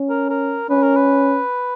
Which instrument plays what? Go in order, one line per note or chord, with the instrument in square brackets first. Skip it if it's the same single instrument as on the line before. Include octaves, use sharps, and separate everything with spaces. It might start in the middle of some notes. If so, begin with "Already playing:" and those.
Already playing: [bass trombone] C#4
[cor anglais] A#4
A#4
[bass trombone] C#4 [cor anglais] B4
[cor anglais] A#4
B4